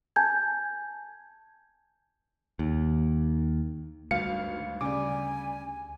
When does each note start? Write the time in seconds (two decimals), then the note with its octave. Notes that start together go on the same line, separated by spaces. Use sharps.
0.16 G#5 A5 G6 G#6
2.59 D#2
4.11 G#1 D2 G2 F5 C#7
4.81 C#3 G3 G#5 D6